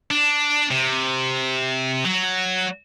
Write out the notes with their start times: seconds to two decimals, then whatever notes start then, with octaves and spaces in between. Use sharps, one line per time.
0.11 D4
0.71 C3
2.05 F#3